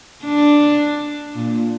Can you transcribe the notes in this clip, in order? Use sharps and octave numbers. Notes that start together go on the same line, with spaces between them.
D4
A#2